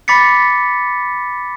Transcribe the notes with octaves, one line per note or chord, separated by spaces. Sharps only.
B5 D6 A6 B6 C#7